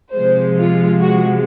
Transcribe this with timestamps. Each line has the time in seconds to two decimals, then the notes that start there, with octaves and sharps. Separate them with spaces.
0.14 C3 F3 G#3 C5
0.58 F4
1.01 F#4